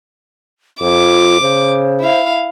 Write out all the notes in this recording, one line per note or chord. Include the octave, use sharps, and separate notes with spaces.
F2 F4 D6
C#3 C5
E4 F5